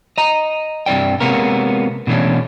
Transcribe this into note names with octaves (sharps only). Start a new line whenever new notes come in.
D#5 A#5
G2 C3 E4 D5 G5
C3 G#3 A#3 B3 C#4 A#4
B2 E3 A3 C#4 D4